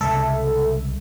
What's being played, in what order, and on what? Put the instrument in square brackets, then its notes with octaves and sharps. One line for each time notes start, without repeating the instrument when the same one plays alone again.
[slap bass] C2 C#3 G#3 [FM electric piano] A4 E5